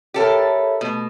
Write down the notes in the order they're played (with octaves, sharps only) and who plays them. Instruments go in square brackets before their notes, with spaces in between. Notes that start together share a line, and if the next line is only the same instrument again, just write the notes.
[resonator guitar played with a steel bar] G4 A4 A#4 [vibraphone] C#5 E5 B5
[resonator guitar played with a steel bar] B2 [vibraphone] A3